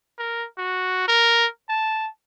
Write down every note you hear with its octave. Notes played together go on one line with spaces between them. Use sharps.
A#4
F#4
A#4
A5